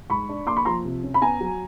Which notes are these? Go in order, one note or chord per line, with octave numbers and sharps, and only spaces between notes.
G#2 B5 C#6
D4
A#3 C6 D6
B5 C#6
F3 A#5 C6
C3
C#4
B5
B3 G#5 A#5
F#3